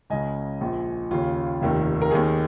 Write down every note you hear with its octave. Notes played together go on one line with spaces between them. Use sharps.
C#2 C#3 D#5 G#5
A#1 A#2
D#2 C#3 F4
F1 D#2 D#3
A#4
D#2 D#3 G#4